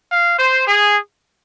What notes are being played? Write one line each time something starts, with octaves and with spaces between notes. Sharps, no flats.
F5
C5
G#4